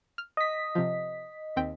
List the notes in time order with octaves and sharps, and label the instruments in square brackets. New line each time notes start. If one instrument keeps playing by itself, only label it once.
[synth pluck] F6
[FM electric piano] D#5 B6
[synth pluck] C3 F3
D#2 C4 G5